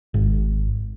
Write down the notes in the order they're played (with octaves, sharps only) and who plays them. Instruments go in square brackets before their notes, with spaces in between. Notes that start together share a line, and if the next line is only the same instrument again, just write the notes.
[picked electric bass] G#1